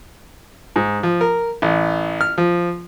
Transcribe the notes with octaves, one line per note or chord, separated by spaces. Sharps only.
G#2
F3
A#4
A1
F6
F3